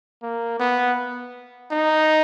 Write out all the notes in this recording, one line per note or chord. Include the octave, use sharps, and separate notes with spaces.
A#3
B3
D#4